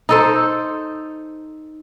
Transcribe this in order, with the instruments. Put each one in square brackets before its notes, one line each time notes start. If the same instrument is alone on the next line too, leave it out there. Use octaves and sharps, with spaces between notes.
[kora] D#4 A4 C5